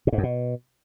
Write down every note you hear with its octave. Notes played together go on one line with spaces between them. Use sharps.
A#2
G#2
F#2
B2